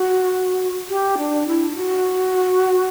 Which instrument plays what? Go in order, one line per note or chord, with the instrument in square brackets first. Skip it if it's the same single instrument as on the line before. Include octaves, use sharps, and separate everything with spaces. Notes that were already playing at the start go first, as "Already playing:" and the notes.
Already playing: [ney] F#4
G4
D4
E4
E4
F#4